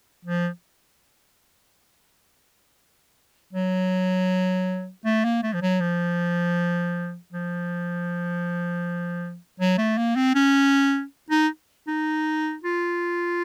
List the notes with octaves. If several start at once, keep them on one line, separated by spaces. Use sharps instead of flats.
F3
F#3
A3
A#3
A3
F3
F#3
F3
F3
F#3
A3
A#3
C4
C#4
D#4
D#4
F4